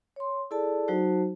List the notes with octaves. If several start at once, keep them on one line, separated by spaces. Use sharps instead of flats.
C#5 C6
E4 G#4 A4 D5 A5
F#3 D#4 F#4 C5 A5